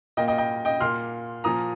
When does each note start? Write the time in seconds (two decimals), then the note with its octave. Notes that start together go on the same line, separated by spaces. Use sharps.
0.17 A#2 A#3 D#5 G5
0.28 D#5 G5
0.38 D#5 G5
0.65 D#5 G5
0.81 A#2 A#3 C6 F6
1.44 A#2 F3 A#3 A#5 D#6